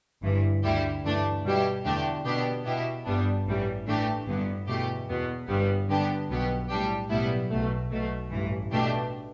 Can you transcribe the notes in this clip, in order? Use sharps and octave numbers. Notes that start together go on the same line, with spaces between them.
G1 G2 E3
D2 D3 G3 E4 G4
G2 E3 A3 D4
B2 G3 E4 G4
E2 D3 A3 D4 G4
B2 B3 D4 G4
B2 B3 E4 G4
G1 G2 G3 B3 D4
A1 A2 E3 G3
A2 E3 A3 D4 G4
G1 G2 D3 B3
E2 B2 A3 G4
E2 B2 B3
G1 G2 G3 B3
G2 D3 B3 D4 G4
B1 B2 B3 G4
A2 G3 D4 G4
B1 A2 G3 B3 E4
B1 B2 A3
B1 B2 A3
A1 G2 E3
B2 A3 D4 G4